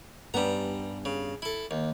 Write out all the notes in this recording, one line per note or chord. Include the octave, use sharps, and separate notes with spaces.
G2 G3 B3 C#4 A#5
C#3
E4 A4
D#2